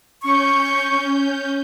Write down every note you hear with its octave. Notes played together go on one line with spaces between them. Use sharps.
C#4 C#6 G6